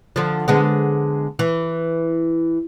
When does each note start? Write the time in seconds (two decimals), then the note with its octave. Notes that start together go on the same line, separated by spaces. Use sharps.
0.16 D3 F3
0.48 D3 G#3 B3
1.39 E3